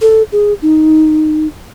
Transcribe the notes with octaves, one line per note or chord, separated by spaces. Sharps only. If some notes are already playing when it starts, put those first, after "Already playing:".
A4
G#4
D#4